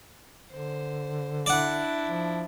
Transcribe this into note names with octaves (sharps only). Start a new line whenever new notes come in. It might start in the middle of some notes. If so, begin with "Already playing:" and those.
D3 C5
D4 E4 D5 F#5
F3